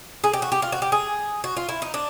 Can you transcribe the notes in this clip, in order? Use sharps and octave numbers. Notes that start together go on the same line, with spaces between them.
G#4
G4
F#4
G4
F4
F#4
G4
G#4
F#4
F4
E4
D#4
D4